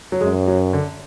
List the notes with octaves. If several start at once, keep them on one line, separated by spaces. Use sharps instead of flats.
F#3
F#2 G#3
F#3
D3